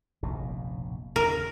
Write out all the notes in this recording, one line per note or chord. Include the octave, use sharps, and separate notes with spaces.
F1 A#1 B2
E2 C#3 A#4